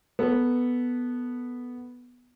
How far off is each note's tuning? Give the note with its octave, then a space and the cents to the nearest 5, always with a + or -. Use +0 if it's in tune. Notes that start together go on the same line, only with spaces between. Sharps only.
B3 +0 A4 +5